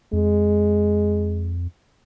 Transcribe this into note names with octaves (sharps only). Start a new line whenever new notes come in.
F2 G#3